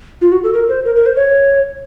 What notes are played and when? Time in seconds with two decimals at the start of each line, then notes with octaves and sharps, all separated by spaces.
0.21 F4
0.32 F#4
0.43 A4
0.53 A#4
0.69 C5
0.85 A#4
0.96 A#4
1.06 C5
1.16 C#5